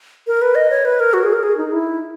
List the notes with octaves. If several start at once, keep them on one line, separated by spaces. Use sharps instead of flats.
A#4
B4
D#5
C#5
B4
A#4
F#4
G#4
A#4
G#4
D#4
E4